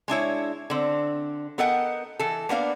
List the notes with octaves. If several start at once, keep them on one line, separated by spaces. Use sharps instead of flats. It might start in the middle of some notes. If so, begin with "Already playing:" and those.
G#3 D4 E4 C#5
D3 C4
B3 A4 A#4 D#5 F#5 G5
E3 A4
A#3 B3 D4 F5